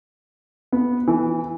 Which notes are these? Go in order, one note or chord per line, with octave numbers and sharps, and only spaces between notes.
B3
E3